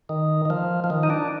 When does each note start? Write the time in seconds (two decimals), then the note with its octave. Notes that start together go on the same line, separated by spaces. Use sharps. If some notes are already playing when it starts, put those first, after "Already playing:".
0.09 D#3
0.45 D#3
0.50 F3
0.84 F3
0.90 D#3
1.03 D#4
1.10 D4